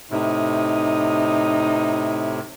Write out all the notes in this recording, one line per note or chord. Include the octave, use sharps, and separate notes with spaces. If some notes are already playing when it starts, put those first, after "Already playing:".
A2 C3 D#4